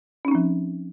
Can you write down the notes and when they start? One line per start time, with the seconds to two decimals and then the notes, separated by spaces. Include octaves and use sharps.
0.25 C#4
0.28 D#4
0.31 C4
0.35 F3